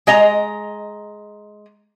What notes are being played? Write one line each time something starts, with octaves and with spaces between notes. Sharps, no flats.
G#3 D#5 A#5